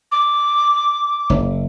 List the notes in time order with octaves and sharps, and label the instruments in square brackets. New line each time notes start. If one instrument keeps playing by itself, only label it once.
[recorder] D6
[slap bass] F#1